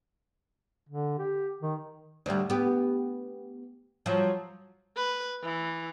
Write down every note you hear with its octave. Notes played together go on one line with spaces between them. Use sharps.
D3
G4
D#3
D2 G3
B3 G4
F3 F#3
B4
E3